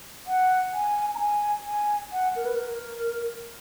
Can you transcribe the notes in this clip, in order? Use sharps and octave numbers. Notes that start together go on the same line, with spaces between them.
F#5
G#5
A#5
G#5
G#5
F#5
A#4
B4
A#4